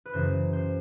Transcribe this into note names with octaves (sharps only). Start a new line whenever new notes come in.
B4
F#2 C#3 E3 C5
C5